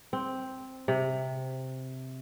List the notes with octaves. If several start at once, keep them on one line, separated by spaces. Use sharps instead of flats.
C4
C3